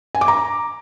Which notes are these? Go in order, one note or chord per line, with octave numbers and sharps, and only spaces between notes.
G#5
D6
A#5